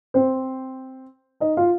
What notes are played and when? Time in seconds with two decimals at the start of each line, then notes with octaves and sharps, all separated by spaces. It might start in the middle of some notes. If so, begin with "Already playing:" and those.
0.14 C4 C5
1.40 D#4 D#5
1.57 F4 F5